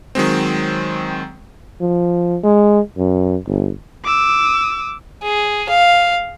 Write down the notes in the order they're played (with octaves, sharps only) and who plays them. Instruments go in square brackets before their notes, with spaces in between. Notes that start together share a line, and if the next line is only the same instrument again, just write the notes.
[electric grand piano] D#3 F#3 G#3 C4
[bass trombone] F3
G#3
F#2
G1
[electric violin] D6 E6
[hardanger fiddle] G#4
F5